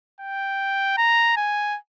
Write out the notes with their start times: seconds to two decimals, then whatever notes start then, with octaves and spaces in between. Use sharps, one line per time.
0.21 G5
0.98 A#5
1.37 G#5